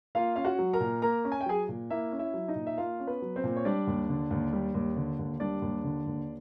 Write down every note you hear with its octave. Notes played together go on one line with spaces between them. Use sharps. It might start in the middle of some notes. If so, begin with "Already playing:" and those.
A#3 F4 F5
C#4 F5
F#4 F#5
F#3
A#4 A#5
A#2
A#3 A#4 A#5
C#4
G#5
G5
F#3 G#4 G#5
A#2
A#3 E4 E5
C#4
E4 E5
F#3
D#4 D#5
A#2
E5
A#3 F4 F5
C#4
B3 B4
F#3
C4 C5
A#2
C#5
G3 D4 D5
D#2
D3
D#2
G3
D#2
D3
D#2
G3 D4 D5
D#2
D3
D#2